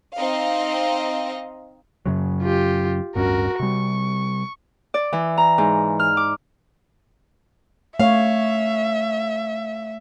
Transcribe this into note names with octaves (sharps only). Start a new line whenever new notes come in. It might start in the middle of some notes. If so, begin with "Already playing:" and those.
C4 D#4 D#5 F5
F#2 C#3 F#3
F4 G4
D1 G2 C#4 F#4 A#4
C3 G3 C#6
D5
E3
A#5
G#2
F6
D6
A3 C#5 E5 F5